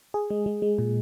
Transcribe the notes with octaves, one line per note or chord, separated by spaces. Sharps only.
G#4
G#3
G#3
G#3
A#2